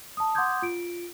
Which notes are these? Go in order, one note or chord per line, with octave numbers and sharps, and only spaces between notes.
A5 D#6
F#5 C6 D6 D#6 G6 G#6
F4 D7